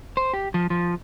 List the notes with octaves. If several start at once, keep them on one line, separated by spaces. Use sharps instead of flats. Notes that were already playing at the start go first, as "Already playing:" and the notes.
C5
G4
F3
F3